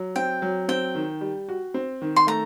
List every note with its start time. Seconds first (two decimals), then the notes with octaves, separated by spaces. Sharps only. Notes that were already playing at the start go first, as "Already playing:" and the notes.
Already playing: F#3
0.16 C4 G5
0.42 F#3
0.68 C4 G5
0.95 D#3
1.21 G3
1.49 F#4
1.74 C4
2.02 D#3
2.16 C6
2.27 A3 A#5